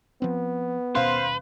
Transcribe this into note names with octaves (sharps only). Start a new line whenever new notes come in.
F3 B3 C4
D#1 B2 C#4 B4 C5 F5 C6